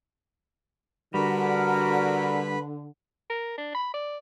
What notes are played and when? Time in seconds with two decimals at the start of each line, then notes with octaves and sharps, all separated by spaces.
1.14 D3 G3 F#4 A#4 B4 B5
3.30 A#4
3.57 D4
3.75 B5
3.94 D5